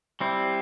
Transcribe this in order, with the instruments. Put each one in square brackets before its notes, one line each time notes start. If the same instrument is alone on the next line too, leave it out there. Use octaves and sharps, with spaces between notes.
[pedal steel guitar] G3 C4 E4